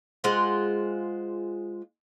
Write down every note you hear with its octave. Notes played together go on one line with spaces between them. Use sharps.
G#3 F4 C5 F#5